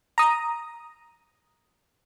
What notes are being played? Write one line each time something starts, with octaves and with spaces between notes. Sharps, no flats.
A#5 D#6